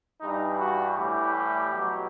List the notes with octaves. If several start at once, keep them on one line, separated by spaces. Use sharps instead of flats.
G2 E3 G3 D#4
F#4
A2 E3 G3 G4
B2 F#3